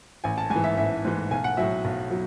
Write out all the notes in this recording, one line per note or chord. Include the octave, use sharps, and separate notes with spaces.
A1 G#5
A5
G#2 G#5
E3
E5
A1 E5
G#2 E3
B1 G#5
F#5
A2 F#3 E5
B1
F#3